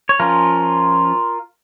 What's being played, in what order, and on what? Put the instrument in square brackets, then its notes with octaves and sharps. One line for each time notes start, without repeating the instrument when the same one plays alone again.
[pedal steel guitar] C#5
F3 C#4 F4 A#4